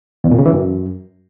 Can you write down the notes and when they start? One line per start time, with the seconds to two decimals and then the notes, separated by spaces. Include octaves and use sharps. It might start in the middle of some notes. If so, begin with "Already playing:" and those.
0.24 E2
0.31 A#2
0.38 C#3
0.46 E3
0.53 F#2